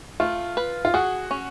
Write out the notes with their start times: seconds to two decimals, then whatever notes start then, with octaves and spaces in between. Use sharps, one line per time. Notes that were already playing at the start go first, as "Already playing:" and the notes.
0.20 A3 F4
0.57 B4
0.85 F4
0.94 F#4 G#4
1.31 C#4